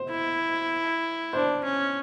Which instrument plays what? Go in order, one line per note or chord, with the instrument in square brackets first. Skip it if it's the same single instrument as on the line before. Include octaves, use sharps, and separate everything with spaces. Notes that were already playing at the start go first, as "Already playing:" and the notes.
Already playing: [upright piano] C5
[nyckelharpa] E4
[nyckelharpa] D4 [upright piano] C5
[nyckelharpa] C#4